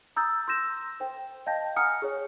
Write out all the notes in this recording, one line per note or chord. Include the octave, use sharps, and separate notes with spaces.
A#5 D#6 E6 G6 A6
C6 E6 G6 A#6 E7
C5 G5
D#5 F5 G5 A5 G6 A#6
F#5 G#5 A#5 D#6 F6 C#7
G#4 C#5